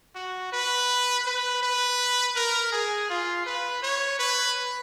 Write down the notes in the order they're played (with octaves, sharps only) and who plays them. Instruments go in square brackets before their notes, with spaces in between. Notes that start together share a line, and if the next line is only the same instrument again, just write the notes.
[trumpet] F#4
B4
B4
B4
A#4
G#4
F4
B4
C#5
B4